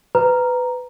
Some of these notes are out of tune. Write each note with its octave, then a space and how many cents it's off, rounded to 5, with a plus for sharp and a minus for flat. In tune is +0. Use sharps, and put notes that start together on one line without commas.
B4 +20 A#5 +0